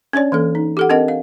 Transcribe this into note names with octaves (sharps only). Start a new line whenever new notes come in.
C#4 D4 C#5 D5
E3 A#3 A4
D#4
G4 A4 F#5
C4 D4 A#4 D#5 F#5
F5